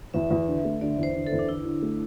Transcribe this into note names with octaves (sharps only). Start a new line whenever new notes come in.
E2 E5
E2
D3
A3
D3 D5
E2
C5
D3
A4
E2
D4
D3 E4
D3
A3